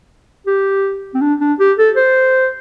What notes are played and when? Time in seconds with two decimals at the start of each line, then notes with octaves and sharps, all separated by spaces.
0.47 G4
1.14 C4
1.21 D4
1.40 D4
1.59 G4
1.78 A4
1.96 C5